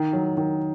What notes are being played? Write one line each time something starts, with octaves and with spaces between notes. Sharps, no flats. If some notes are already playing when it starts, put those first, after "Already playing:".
Already playing: D#3
F#3
D#3